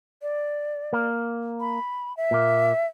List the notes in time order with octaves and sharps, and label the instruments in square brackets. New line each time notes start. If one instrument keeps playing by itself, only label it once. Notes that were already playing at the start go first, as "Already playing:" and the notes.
[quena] D5
[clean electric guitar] A#3
[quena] B5
E5
[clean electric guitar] A#2 A#3